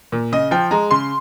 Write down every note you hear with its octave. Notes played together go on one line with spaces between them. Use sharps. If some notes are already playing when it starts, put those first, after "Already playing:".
A#2
C#3 D#5
F3 G5
G#3 A#5
C#3 C6